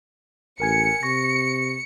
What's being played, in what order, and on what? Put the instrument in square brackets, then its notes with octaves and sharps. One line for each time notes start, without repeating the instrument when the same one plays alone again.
[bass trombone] A1 [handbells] A#4 G#5 G#6 [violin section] C#7
[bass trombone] C3 [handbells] C#6 A#6